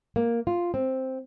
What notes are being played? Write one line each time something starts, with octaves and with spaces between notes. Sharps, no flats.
A#3
F4
C4